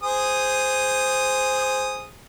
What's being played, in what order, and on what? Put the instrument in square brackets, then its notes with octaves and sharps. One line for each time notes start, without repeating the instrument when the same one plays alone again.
[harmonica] G#4 C5 D#6